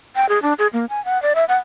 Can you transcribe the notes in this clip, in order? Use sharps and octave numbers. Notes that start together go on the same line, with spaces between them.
G5
G#4
D4
G#4
A#3
G#5
F#5
D5
E5
F#5